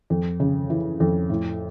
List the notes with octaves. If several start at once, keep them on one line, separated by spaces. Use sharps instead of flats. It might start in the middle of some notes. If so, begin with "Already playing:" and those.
F2
C#3
E3
F2
A2